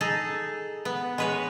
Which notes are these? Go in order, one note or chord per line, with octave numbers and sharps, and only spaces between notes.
D#4 G#4 A4
B3
G#3 B4 C#5